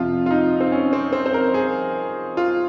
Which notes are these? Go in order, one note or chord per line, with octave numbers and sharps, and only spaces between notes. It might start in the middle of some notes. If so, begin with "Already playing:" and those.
Already playing: F2 C3 F3 F4
F4
D#4
C4
C#4
C4
C4
C5
A#4
G#4
F4